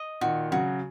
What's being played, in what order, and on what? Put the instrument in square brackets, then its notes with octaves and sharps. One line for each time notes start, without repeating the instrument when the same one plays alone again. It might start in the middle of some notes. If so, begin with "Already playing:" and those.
Already playing: [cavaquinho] D#5
[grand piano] A#2 D#3 [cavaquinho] F#4
[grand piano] C#3 F#3 [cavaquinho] F#4